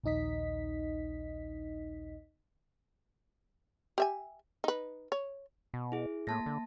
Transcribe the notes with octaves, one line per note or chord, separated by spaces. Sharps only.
A#1 D#2 D#4 D#5 B6
G4 E5 G#5
D#4 B4
C#5
B2
E4 G#4
A2 A#3 A5 A#6
D3